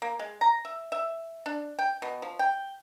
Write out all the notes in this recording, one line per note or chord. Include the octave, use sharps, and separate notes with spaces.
A#3
G#3
A#5
E5
E5
D4
G5
B2
F3
G5